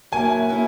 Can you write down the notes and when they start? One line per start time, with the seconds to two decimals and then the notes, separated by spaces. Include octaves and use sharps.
0.12 F#3 A#3 C#4 E4 G#5
0.49 F#3 A#3 C#4 E4